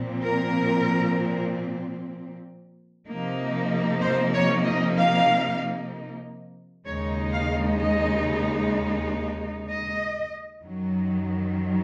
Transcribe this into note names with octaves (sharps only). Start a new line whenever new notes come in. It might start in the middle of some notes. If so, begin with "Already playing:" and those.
Already playing: A#2 F3 C4
A#4
C3 F3 A#3 D#4
C5
C#5
D#5
F5
D#2 C#3 G#3 D#4 C#5
F5
D#5
D#5
F#2 D#3 F#3